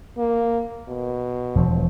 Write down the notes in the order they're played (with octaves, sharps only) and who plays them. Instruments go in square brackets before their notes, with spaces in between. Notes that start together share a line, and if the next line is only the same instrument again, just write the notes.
[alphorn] A#3
B2
[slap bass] E1 F3 F#3